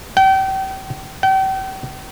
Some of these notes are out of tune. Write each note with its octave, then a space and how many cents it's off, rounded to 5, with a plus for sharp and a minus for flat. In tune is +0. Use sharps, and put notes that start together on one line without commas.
G5 -35
G5 -40